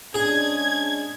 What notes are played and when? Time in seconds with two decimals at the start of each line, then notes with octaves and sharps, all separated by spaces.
0.14 G#3 C#4 D4 G#4 G#6